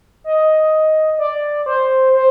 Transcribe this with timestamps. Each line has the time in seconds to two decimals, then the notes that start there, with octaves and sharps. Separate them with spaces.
0.24 D#5
1.19 D5
1.66 C5
2.14 C5